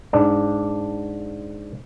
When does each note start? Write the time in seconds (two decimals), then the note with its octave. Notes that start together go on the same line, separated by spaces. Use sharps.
0.13 G#2 D4